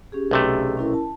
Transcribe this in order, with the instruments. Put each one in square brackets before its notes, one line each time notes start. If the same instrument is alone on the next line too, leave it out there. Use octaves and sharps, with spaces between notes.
[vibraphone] C#4 G4 G#4
[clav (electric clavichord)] B1 C3 A3
[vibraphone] C#4 E4 A#4
A5